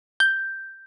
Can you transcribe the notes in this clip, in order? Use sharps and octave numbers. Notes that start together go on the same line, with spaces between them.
G6